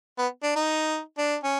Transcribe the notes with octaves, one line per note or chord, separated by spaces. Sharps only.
B3
D4
D#4
D4
C#4